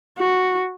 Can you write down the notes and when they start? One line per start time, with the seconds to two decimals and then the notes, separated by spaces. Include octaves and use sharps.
0.18 F#4